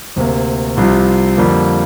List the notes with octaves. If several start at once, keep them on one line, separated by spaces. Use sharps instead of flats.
D2 C3 A#3
C2 C3 F3
F2 D3 G3 A#3